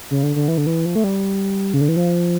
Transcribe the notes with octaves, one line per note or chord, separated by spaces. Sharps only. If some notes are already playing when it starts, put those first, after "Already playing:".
C#3
D3
D3
E3
D3
E3
F3
A3
G3
C#3
D3
E3
F3